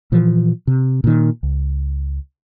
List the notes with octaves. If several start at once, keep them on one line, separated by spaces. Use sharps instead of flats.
A#2 E3 F3
C3
A#2 D#3
C#2